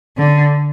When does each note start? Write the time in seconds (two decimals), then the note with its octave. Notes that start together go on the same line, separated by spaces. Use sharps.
0.17 D3